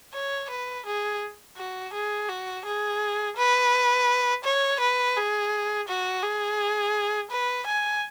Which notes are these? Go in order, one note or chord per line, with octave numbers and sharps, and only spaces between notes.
C#5
B4
G#4
F#4
G#4
F#4
G#4
B4
C#5
B4
G#4
F#4
G#4
B4
G#5